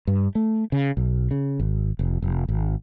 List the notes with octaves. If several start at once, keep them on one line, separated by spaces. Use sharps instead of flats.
G2
A3
C#3
B1
C#3
G#1
F1
F1
G#1